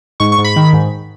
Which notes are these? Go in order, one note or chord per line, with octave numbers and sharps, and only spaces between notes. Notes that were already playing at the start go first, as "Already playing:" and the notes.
G#2 C#6
C#6
G#2
B5
D#3
G#2